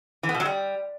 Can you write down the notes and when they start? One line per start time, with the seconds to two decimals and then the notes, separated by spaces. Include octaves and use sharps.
0.23 E3
0.29 B3
0.34 B2
0.40 F#3
0.45 G3